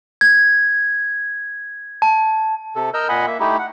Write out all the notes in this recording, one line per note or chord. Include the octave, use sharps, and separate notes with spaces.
G#6
A5
C3 A4
A#4 D#5 E6 F6 G6
A#2 D#5 F#5 G#5 B5
A#3 E5
A3 D#4 E4 G4
F#5